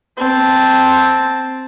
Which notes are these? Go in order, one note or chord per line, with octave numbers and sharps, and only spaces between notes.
C4 A5